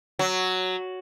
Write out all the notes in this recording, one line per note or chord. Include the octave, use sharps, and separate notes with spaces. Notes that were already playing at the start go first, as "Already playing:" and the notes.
F#3